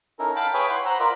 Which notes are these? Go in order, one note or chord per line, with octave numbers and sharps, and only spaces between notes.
C#4 D#4 E4 A4 A#4
F5 G5 A5 B5
G#4 B4 C#5 E5 G5 G#5
E4 F#5 C6 F#6
C5 F#5 A#5 B5 E6
F4 A#4 D5 E5